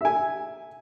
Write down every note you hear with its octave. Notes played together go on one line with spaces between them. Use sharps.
E5 G#5